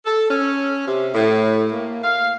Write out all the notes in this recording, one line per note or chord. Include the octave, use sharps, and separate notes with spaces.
A4
C#4
C3
A2
A#3
F5